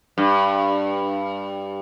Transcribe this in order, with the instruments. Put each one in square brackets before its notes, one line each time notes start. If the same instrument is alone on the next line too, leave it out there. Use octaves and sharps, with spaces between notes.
[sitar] G2